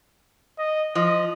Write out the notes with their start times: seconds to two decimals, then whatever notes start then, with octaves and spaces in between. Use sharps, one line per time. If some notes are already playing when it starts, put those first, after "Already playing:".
0.58 D#5
0.95 F3 D#5